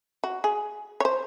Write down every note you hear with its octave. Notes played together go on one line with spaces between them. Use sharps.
F#4
G#4
C#5
C5